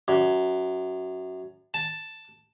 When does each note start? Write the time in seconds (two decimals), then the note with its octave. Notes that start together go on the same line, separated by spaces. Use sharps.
0.08 F#2
1.74 A5